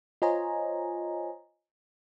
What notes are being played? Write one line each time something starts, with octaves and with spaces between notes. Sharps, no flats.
F4 C5 C#5 D#5 G#5 A#5